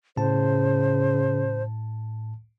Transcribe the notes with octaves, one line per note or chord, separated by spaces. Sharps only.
A2 C#3 C5 A5